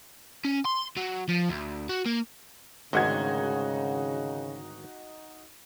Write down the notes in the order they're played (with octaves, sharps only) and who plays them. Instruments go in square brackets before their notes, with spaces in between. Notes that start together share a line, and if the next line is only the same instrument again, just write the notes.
[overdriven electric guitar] C#4
C6
F#3
F3
D2
F#4
A#3
[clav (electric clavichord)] G#1 D2 G#2 [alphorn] C#3 [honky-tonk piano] D#4 F#4 G#6